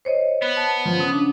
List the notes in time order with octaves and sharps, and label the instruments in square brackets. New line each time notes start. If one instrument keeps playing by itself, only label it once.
[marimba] C5 C#5 D#5
[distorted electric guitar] B3
[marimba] A5
[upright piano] F3
C#3 D#6
[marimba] D4